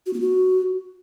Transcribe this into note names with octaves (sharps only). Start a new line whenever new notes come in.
F#4
B3
F#4